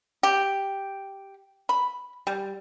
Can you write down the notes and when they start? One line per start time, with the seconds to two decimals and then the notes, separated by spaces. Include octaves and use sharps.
0.23 G4
1.69 B5
2.27 G3